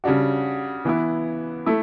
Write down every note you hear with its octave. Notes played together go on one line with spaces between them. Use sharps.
C#3 G3 D4 F#4
E3 B3 E4
A3 E4